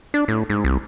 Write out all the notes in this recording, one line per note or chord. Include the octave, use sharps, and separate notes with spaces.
D4
A2
G#2
C2